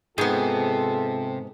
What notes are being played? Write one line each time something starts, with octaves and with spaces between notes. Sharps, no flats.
G#2 C3 B3 F4 G#4 A4 G5